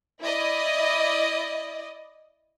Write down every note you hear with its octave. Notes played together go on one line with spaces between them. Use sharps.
E4 D5 D#5